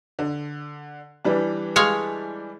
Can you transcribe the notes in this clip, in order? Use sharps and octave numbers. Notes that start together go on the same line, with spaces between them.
D3
E3 G3 D4
G#3 C#5 F5